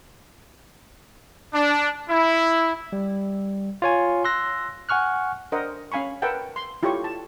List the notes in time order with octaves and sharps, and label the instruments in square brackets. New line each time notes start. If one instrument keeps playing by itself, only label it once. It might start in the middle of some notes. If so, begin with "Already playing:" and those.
[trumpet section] D4
E4
[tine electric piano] G3
F4 C#5 G#5
C6 E6 F#6 A#6
F#5 G#5 C#6 F6 F#6
[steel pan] D4 A#4 C5 D#5 F#5
C#4 F5 G#5 B5 C#6
A#4 B4 E5 F#5 G5 A5
C6
E4 F4 G4 A4 C#5 C#6
A5